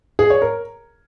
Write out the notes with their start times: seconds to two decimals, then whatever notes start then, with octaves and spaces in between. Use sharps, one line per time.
0.19 G#4
0.30 C#5
0.42 A#4